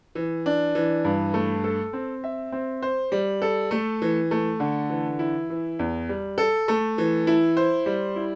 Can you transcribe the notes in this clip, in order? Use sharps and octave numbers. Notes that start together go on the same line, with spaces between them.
E3
D4
E3
G2
A3
A4
C4
E5
C4
C5
G3
A4
A3
E3
A3
D3
E3
E4
E3
E2
G3
A4
A3
E3
E4
C5
G3
E4